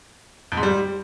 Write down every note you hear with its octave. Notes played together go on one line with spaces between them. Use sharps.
F2
G#2
G3